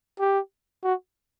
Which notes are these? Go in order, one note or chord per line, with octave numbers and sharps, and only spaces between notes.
G4
F#4